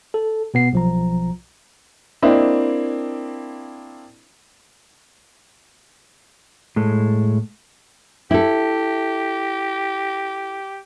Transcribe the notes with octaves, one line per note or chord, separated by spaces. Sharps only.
A4
B2 B3 C7
B1 F3 A#5
A#3 C4 D4 E4 D#5
A2 G#3 A4
E4 G4 A4